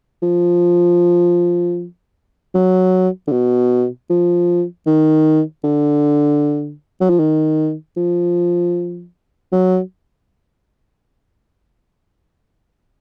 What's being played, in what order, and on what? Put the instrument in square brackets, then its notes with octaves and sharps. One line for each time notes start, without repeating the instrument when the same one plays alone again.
[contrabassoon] F3
F#3
D3
B2
F3
D#3
D3
F#3
F3
D#3
F3
F#3